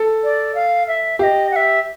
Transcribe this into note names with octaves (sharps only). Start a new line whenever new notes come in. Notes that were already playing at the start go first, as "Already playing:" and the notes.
Already playing: A4
D5
F5
E5
G4 D#5 F5
F#5
E5